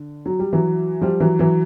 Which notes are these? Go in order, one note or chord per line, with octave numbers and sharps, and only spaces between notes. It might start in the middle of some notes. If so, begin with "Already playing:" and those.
Already playing: D3
F#3
G3
E3 F#3
F3 G3
E3 F#3
E3 F#3